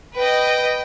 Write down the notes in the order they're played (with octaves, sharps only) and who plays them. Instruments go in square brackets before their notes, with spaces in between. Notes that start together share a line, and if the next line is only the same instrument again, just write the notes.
[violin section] B4 D#5 [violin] G5